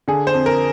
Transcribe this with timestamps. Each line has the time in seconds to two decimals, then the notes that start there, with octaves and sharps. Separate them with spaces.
0.08 D3 G#4
0.27 C5
0.34 F2
0.46 A#4